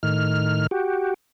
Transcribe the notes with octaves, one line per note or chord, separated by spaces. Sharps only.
A2 D#3 F6
F#4 G4